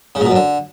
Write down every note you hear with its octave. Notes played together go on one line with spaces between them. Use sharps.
C#3
A#2
B2
F#2
D3